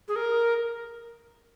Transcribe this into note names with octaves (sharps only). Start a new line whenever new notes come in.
G#4
A#4